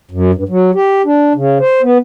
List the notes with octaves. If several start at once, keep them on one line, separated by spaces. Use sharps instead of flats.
F#2
G2
F#3
G4
D4
C#3
C5
B3